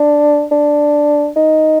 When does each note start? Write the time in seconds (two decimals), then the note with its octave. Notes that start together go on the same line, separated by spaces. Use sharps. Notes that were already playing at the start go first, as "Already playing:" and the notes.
Already playing: D4
0.51 D4
1.36 D#4